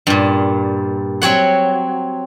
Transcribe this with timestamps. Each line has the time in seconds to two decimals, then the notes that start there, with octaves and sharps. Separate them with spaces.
0.07 G2 A#2
1.22 F#3 C4 C#5 F#5